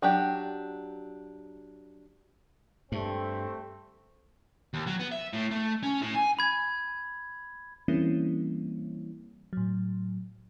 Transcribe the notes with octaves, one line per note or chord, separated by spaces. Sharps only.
F#3 D4 G4
G2 A3 C4
D#2
F#3
B3
E5
A2
A3
C#4
A2
G#5
B5 G#6
E3 G3 A#3 C4 C#4 E4
A2 F#3